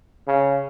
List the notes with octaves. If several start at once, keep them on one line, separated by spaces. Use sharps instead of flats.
C#3